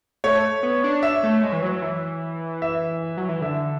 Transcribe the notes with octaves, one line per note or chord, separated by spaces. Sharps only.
A3 C#5
B3
D4
E5
A3
G#3
E3
F#3
E3
E5
F#3
E3
D3 E5